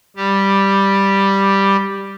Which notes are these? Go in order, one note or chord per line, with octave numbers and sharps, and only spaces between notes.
G3 G4